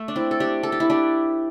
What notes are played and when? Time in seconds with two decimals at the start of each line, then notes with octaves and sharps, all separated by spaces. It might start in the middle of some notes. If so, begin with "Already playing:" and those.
Already playing: A3
0.08 D4
0.16 C4 E4
0.31 A4
0.40 D4 G4
0.63 A4
0.72 G4
0.80 E4
0.90 D4 G4